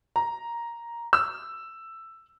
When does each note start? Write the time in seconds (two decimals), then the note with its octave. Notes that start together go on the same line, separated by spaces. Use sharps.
0.16 A#5
1.13 E6